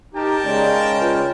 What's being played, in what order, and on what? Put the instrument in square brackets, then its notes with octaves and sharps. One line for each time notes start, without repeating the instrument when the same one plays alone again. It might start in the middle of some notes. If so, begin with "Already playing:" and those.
[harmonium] D#4 G4 [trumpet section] A#4 G5 A5
[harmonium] C#3 G#3 C#4 [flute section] D5
[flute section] F4 B4 C#5